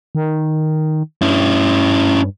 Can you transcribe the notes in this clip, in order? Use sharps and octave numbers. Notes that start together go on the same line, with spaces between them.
D#3
G2 C#4 E4